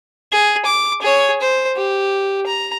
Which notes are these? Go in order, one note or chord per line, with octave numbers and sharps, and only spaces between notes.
G#4
D6
G#4 C#5
C5
G4
A#5